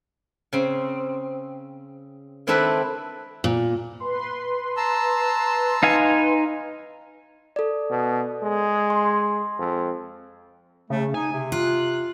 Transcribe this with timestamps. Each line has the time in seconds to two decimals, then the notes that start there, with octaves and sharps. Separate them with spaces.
0.53 C#3 C4
2.47 D#3 C4 D4 E4 A4 B4
3.44 A#2
4.00 B4 C6
4.77 A5 A#5 E6
5.83 D#4 F5 G#5
7.56 A4 D5
7.90 B2
8.43 G#3
8.90 C6
9.59 F2
10.90 C#3 A3
11.14 D#4 G#5
11.33 C3
11.52 F4 F#6